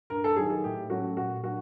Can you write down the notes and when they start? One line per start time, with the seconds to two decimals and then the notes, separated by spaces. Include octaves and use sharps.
0.10 G2 A#4
0.24 A4
0.36 D#3 F#3 G#4
0.50 G#4
0.64 A2 G4
0.90 F#3 A3 C#4 F#4
1.17 A#2 F#4
1.43 F#3 A#3 D4 F#4